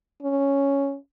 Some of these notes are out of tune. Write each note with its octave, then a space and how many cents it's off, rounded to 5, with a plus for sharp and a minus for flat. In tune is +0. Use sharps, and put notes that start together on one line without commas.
C#4 +0